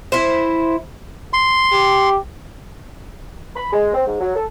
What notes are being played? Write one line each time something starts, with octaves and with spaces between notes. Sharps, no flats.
E4 C5
C6
G4
B5
G#3
C4
G#2
F#3
A4